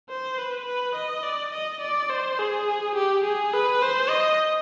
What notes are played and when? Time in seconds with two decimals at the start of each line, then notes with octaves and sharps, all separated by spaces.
0.09 C5
0.38 B4
0.66 B4
0.96 D#5
1.24 D5
1.53 D#5
1.82 D5
2.10 C5
2.39 G#4
2.96 G4
3.25 G#4
3.53 B4
3.82 C5
4.10 D#5